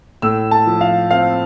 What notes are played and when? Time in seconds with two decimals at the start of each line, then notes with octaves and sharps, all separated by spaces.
0.22 A2 E6
0.51 A5
0.67 F3
0.81 F5
1.10 C4 F5